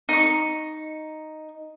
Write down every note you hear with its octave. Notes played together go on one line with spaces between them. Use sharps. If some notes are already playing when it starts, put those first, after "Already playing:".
D#4 C#6